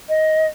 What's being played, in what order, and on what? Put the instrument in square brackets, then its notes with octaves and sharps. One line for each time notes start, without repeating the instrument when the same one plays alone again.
[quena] D#5